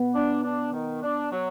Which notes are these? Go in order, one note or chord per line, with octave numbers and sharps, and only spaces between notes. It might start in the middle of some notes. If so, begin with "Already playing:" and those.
Already playing: B3
D4
D4
D#3
D4
F#3